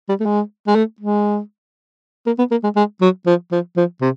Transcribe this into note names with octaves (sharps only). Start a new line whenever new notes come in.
G3
A3
G#3
G#3
A3
G#3
A#3
B3
A#3
G#3
G#3
F#3
F3
F3
F3
C3